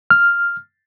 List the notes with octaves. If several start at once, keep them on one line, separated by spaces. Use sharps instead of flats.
F6